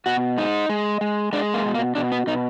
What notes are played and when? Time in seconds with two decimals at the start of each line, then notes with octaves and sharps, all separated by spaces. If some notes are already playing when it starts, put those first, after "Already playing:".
0.06 B2 F#4
0.37 G#3 D#4
0.69 G#3
1.01 G#3
1.33 G#3 D4
1.54 A#3
1.65 B2
1.75 A#3
1.95 B2 D4
2.12 B3
2.27 B2 D#4